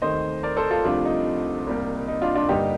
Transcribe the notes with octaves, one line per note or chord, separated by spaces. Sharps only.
D#2 D#3 A3 C4 C5 D#5
A#4 D5
A4 C5
F4 A4
C2 C3 F3 A3 C4 D4 F4
D#4
C2 C3 G3 A#3
D#4
D4 F4
D4 F4
G2 D3 G3 A#3 D#4 G4